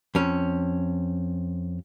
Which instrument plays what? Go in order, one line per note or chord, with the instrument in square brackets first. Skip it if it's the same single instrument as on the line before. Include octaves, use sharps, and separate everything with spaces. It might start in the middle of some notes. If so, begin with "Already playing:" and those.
[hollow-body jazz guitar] F2 C#4